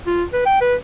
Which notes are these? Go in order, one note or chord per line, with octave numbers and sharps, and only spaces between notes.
F4
B4
G5
B4